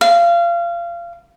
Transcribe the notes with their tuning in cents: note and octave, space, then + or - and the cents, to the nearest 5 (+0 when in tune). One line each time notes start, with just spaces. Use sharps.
F5 -25